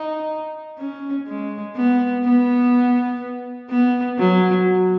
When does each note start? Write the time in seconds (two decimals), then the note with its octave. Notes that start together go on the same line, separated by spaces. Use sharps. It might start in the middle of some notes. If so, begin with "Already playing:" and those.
Already playing: D#4
0.79 C#4
1.28 G#3
1.76 B3
2.25 B3
3.70 B3
4.19 F#3